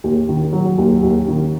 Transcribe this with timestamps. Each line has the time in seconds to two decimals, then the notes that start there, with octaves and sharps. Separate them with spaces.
0.04 D#2
0.29 D#3
0.53 F#3
0.78 D#2
1.03 D#2
1.28 D#3